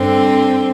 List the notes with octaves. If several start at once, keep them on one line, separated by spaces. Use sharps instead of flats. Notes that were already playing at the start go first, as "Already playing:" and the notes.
Already playing: G2 D3 C4